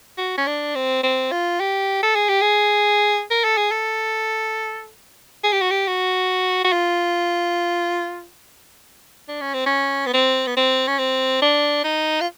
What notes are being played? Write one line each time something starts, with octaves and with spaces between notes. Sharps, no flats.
F#4
C#4
D4
C4
C4
F4
G4
A4
G#4
G4
G#4
A#4
A4
G#4
A4
G#4
G4
F#4
G4
F#4
F#4
F4
D4
C#4
C4
C#4
B3
C4
B3
C4
C#4
C4
D4
D#4
F4